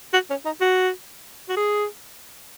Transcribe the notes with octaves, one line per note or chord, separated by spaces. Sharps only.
F#4
C#4
D#4
F#4
F#4
G#4